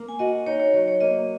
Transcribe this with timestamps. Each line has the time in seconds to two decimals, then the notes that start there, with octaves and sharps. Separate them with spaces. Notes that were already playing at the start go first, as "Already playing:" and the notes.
Already playing: A#3
0.09 G#5
0.19 F#4 D#5
0.46 D#4 C#5
0.60 C#5
0.74 F#3
0.88 C#5
1.00 A#3 D#5